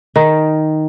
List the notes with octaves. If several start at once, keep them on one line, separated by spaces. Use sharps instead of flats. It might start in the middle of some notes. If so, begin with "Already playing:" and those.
D#3